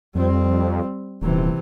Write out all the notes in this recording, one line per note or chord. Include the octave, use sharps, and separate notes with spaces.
F2 G3 C4
D#1 C3 E3